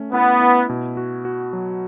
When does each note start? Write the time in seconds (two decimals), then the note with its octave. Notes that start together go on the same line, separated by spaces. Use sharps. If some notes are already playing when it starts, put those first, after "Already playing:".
Already playing: A3 C#4
0.13 B3 E4
0.41 E4
0.69 B2
0.97 F#4
1.25 F#4
1.53 F#3